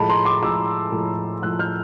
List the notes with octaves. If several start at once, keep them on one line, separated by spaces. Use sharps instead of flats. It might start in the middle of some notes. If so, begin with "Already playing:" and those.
Already playing: A2 F3 G#3 A5 B5
A#5 C6
C6 D6
A2 F3 G#3 D6 E6
A2 F3 G#3
A2 F3 G#3 E6 F#6
F6 G6